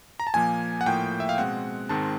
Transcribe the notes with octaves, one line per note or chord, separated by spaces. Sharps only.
A#5
A5
A#2 F3 A#3 G#5
F#5
A2 F3 A#3 G5
E5
F5
B2 G#3 C4 F#5
G#2 D#3 G#3 C4 A5